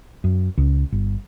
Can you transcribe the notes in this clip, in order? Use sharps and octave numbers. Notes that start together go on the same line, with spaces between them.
F#2
C#2
G1